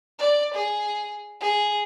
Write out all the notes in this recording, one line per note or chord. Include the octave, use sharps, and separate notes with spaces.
D5
G#4
G#4